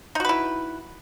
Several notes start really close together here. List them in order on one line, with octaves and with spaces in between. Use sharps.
D#4 F#4 B4 E4